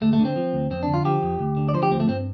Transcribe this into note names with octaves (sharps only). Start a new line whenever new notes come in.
D2 A3
A3
D3
C4
F3
D2
F2 C4
D4
D3
F4
F3 G4
F2
D2
D3
D5
F3 C5
G4
D2 C4
A3
G2 C4